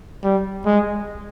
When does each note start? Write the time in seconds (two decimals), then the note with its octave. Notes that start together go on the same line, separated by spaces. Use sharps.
0.24 G3
0.66 G#3